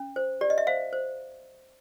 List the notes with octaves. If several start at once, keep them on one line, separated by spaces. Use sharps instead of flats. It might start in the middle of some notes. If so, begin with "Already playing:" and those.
Already playing: C#4
C5
G4 D5
D#5
E5
C5 F5
C5